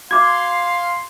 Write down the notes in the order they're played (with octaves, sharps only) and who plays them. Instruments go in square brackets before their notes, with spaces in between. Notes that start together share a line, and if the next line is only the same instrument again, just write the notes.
[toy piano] F#4 D6 [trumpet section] F5 C6 [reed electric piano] G#6